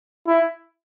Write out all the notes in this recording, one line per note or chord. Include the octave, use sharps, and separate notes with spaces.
E4